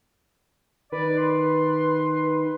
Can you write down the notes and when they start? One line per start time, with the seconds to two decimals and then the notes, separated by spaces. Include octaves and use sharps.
0.92 D#3 B4 D5
1.18 C6